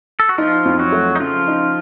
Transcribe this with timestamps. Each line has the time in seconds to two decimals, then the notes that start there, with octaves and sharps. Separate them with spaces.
0.20 A4
0.29 F#4
0.38 F3 D#4 F4
0.65 F2
0.79 F#3 F#4
0.92 A3
1.16 D#4
1.20 C#3 F3 F4
1.48 D#4